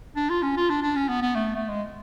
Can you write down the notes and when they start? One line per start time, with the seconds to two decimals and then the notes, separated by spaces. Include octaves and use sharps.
0.16 D4
0.30 F4
0.43 C#4
0.56 F4
0.70 D4
0.82 D4
0.95 C#4
1.09 B3
1.21 B3
1.35 A3
1.56 A3
1.69 G#3